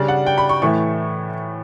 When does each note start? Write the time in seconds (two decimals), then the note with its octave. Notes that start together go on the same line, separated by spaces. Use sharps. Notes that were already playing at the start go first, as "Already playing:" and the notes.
Already playing: C#3 G3 D4 D5
0.08 F#5
0.26 G5
0.38 B5
0.49 C#6
0.62 A2 E3 A3 E4 C#6